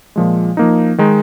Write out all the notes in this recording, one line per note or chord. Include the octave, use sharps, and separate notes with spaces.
A#2 F3 G#3
F3 A#3 D#4
D#3 G#3 D#4